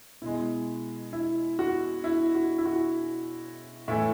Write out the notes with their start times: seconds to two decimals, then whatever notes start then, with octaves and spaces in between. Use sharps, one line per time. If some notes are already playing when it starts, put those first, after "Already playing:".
0.22 B2 G#3 E4
1.13 E4
1.59 F#4
2.04 E4
2.35 F#4
2.58 E4
2.65 F#4
3.88 A2 E3 A3 E5